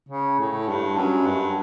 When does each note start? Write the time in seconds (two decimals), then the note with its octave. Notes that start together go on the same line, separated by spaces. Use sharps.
0.09 C#3
0.39 A2
0.68 G2
0.97 F#2
1.26 G2